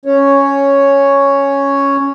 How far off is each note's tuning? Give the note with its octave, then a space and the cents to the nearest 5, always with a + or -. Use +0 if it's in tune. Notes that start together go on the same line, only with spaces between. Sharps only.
C#4 +0 C#5 +0